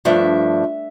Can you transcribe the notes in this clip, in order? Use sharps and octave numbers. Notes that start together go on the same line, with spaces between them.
G2 F3 A3 D4 E5